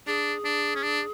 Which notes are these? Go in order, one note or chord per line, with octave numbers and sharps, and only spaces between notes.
D4 G#4
D4
C#4
D4